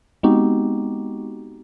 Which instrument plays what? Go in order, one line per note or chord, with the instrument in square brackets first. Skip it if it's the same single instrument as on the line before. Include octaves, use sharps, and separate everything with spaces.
[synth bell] G#3 B3 C4 D#4 F#4 G4